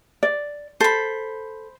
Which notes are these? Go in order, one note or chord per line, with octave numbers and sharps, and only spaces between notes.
D5
A4 C5 B5